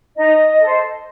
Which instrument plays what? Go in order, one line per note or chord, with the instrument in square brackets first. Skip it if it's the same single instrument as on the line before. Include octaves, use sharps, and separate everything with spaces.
[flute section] D#4 D#5
A4 C5